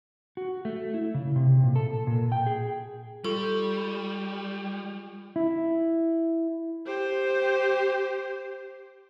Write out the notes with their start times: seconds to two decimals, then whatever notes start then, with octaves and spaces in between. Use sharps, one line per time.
0.37 F#4
0.65 A3
0.94 E4
1.14 C#3
1.36 C3
1.63 A#2
1.76 A4
2.07 A#2
2.32 G5
2.46 G#4
3.25 G3 F4 A4 C#6
5.36 E4
6.86 G4 C5